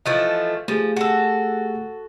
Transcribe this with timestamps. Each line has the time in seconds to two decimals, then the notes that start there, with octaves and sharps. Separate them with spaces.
0.06 E3 F3 A3 D#5
0.68 F3 A3 G4 G#4
0.96 F#4 A4